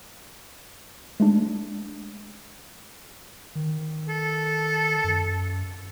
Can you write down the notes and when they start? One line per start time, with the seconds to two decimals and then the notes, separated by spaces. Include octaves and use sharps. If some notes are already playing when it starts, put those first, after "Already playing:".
1.20 G#3 A3 D4
3.55 D#3
4.09 A4
5.04 F#2